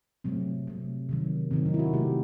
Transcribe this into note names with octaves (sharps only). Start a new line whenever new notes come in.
C3 F#3 A3 C4
C3 F#3 A3
C3 D#3 F#3
C3 D#3 F#3 C4
D#4
E4
F#4
C3 D#3 A3 G4